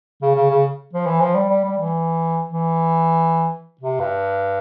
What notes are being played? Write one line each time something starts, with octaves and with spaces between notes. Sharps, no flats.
C#3
C#3
C#3
F3
E3
F3
G3
G3
G3
E3
E3
C3
G2